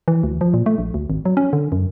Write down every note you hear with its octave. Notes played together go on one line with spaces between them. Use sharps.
E3
D2
F3
A#2
A3
A#1
D2
G#1
F#3
C#4
D3
F#2